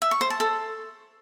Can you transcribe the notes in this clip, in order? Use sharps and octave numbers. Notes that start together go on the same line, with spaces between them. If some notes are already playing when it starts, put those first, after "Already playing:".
E5
C#6
C5
A5
A4